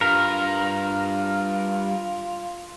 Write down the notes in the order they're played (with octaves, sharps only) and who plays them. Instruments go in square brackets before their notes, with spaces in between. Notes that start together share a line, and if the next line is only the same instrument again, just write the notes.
[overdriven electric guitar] G2 [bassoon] F4 [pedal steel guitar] A#4